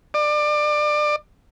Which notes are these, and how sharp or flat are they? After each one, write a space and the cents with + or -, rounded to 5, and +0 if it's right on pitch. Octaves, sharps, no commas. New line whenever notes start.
D5 +25